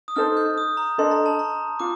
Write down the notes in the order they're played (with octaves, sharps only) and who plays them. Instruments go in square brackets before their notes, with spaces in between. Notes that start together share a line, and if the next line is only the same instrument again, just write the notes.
[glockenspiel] D#6
[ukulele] D#4 A4 C5 [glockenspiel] F6
[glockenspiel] G6
D#6
A#5
[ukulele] D4 A4 D#5 [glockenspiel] C6
[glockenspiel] A#5
A5
A#5
[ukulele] F4 [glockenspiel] D6